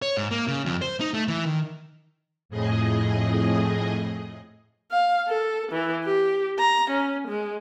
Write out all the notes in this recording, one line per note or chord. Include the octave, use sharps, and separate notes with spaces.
C#5
G#2
A#3
C#3
F2
C5
D#4
A3
E3
D#3
F2 A2 G#4 D#5
F5
A4
E3
G4
A#5
C#4
G#3